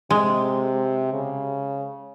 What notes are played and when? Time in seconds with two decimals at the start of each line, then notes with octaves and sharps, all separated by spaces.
0.10 C3 G#3
1.13 C#3